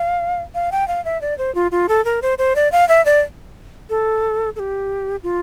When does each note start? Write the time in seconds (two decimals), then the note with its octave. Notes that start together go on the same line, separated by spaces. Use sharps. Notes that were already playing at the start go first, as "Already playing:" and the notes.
Already playing: F5
0.55 F5
0.72 G5
0.88 F5
1.05 E5
1.21 D5
1.38 C5
1.55 F4
1.71 F4
1.89 A4
2.05 A#4
2.22 C5
2.38 C5
2.56 D5
2.72 F5
2.89 E5
3.05 D5
3.90 A4
4.56 A4
4.59 G4
5.23 F4